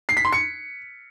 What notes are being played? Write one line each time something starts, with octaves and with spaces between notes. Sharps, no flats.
C7
B6
C6
C#7